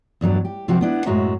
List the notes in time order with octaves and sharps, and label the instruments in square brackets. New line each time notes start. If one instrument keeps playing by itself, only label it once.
[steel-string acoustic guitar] E2 G2 F#3 D4
G4
C3 F3 F#3 C4 F#4 G4
B3 D4 E4
F#2 A2 G#3 F#4 E5 A#5